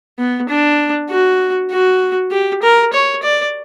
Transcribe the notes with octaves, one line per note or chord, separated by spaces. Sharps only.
B3
D4
F#4
F#4
G4
A#4
C#5
D5